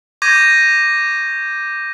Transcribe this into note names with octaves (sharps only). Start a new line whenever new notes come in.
C#6 D6 G6 G#6 A#6 D#7